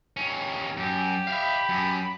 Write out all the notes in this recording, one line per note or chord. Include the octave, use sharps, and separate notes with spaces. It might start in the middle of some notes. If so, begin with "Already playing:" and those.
D#2 C#4
F#2 G4
E5 F5 B5
F#2